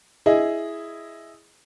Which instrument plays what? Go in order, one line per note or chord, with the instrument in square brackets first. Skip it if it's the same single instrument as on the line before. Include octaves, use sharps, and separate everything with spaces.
[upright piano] E4 G#4 D#5